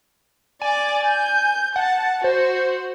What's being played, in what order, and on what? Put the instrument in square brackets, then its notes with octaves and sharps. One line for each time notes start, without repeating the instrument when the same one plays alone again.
[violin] D5 D6 [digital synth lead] G#5
[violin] G6
[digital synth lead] F#5 [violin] A5
[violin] F#4 [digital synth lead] C5